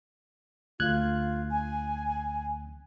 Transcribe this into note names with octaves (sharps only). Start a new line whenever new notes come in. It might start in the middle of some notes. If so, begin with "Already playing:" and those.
D2 F4 F#6 G#6
G#5